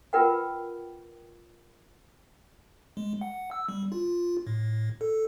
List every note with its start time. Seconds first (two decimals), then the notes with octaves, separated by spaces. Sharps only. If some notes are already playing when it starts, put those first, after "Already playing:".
0.13 F4 A#4 B4 F#5 G5
2.97 G#3
3.21 F#5
3.51 E6
3.69 G3
3.92 F4
4.47 A2
5.01 A4